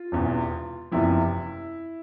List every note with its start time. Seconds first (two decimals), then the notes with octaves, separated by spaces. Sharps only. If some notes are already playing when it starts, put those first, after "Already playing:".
Already playing: F4
0.12 E1 E2 C3
0.91 F#1 E2 C3 F3 E4